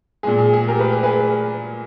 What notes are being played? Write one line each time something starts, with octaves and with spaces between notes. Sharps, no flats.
A#2 G#3 G#4
G#4
G#4
G4 A#4
G#4 B4
G#4
G#4 B4